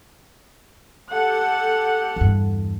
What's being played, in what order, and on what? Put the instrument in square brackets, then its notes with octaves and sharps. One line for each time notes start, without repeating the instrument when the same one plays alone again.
[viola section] G4 A4 F#5
[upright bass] E2 G2